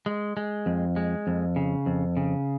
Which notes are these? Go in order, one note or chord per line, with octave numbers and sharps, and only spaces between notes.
G#3
G#3
F2
G#3
F2
C#3
F2
C#3